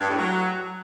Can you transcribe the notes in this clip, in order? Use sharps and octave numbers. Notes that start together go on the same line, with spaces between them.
G2
A2
F#3